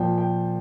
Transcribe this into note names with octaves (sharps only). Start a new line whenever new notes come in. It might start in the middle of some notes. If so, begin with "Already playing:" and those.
Already playing: A#2 F3 G5
G5